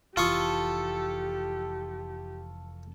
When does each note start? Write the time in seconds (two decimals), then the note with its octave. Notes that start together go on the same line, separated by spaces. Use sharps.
0.17 F1 E3 F4 G4 A4 C#6 D#6